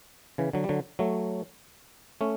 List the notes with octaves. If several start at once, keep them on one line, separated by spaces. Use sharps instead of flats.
C#3 E3
D3 F#3
G3
D3 F#3
F#3 A3
A3 C#4